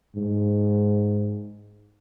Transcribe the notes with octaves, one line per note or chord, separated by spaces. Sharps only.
G#2